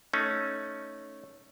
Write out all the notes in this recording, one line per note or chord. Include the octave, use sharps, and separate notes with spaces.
A3 C#4 D#4